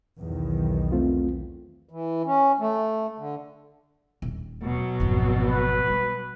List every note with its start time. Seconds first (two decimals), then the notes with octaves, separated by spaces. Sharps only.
0.23 B1 E2 D#3
0.92 A3 C4 F4
1.89 E3
2.26 C#4
2.60 A3
3.18 D3
4.22 D#1
4.63 B2 F#3
5.00 G#1 F2
5.46 B4
5.87 G3